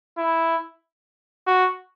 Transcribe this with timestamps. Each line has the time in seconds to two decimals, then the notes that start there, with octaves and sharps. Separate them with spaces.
0.18 E4
1.47 F#4